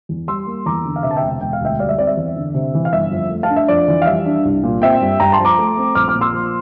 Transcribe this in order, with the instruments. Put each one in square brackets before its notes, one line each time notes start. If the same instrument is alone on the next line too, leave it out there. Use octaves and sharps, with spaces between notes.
[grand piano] E2
G3 C6 E6
A#3
E2 A#5 D6
D3
F5
C3 E5
A5
E5 G5
E1
E1 G5
F5
D2 E5 G5
G3 D5 F5
E5
C4 D5
E5
E2
D3
C3
E3
F5
G1 E5
F2
A3
F5 A5
D4
E5
F2 D5
E3
F5
G3 E5
D4
C2
A#2
C4 E5 G5
G2
G2 G5 A#5
A5 C6
F3
A#5 D6
A3
C4
A#1 D6 F6
D6 F6
A#2
C6 E6
F3